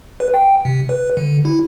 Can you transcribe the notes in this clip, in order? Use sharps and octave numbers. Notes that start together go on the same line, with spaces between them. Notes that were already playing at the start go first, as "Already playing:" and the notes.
B4
G5
C3
B4
D3
E4